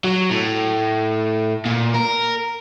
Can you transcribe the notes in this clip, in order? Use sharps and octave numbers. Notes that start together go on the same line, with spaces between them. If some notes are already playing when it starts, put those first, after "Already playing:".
F#3
A2
A#2
A#4